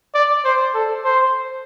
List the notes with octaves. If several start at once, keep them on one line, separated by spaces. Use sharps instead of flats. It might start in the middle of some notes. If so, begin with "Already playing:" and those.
D5
C5
A4
C5